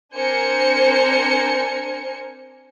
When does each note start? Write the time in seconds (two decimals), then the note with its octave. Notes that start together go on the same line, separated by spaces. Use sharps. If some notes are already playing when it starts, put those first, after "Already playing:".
0.15 C4 D4 A#4 C5 G#5 C#7